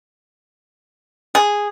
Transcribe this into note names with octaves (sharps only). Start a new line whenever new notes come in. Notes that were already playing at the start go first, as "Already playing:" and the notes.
G#4